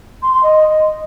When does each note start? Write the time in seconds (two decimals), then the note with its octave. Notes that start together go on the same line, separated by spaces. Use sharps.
0.22 C6
0.33 C6
0.43 D#5